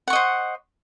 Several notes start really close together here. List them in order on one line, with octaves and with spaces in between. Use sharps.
F#5 C#6 D#5 C5